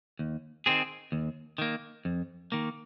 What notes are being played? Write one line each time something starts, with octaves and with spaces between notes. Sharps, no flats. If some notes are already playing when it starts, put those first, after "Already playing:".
D#2
D#3 C4 G#4
D#2
D#3 A#3
F2
D#3 A#3